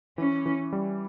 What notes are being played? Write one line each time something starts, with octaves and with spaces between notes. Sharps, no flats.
E3 C#4
E3
G3